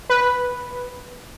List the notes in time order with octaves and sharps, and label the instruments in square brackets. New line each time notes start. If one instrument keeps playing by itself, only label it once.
[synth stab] B4